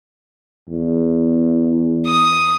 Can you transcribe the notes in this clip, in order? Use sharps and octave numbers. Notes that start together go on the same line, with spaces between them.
E2
D#6